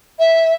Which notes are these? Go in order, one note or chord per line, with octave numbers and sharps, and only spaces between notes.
E5